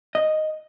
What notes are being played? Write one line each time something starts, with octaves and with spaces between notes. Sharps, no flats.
D#5